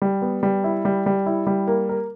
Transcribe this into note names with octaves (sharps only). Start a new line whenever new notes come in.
G3
B3
G3
E4
G3
G3
E4
G3
A#3
A#4